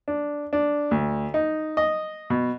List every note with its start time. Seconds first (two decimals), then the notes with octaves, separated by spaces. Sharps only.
0.08 D4
0.53 D4
0.91 D2
1.34 D#4
1.77 D#5
2.30 B2